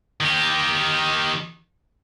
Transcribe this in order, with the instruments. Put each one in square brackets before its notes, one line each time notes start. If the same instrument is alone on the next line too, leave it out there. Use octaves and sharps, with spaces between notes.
[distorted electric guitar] D#3 G4